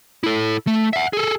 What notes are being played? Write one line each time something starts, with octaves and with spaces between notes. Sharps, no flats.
E4 A4
A3
E5 F#5
G#4 A4